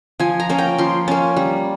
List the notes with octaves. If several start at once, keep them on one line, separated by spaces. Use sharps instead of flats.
F3 G#5
A#5
A#3 C#4
G5
F3 C6
A#3 C#4
G3